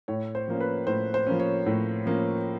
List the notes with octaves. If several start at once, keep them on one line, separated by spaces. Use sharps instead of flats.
A2 C#5
C5
F3 A#3 C#4
B4
A2 C5
C5
F3 A#3 C#4
C#5
A2
F3 A#3 C#4